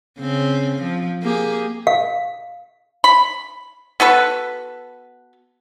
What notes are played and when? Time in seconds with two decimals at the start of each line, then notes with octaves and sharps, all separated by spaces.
0.20 C#3 C4
0.82 F3
1.22 A#3 G4 G#4
1.87 F5
3.04 B5
4.00 B3 F#4 A4 B4